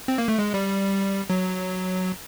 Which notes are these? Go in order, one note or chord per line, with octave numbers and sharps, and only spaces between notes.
C4
A#3
A3
G#3
G3
F#3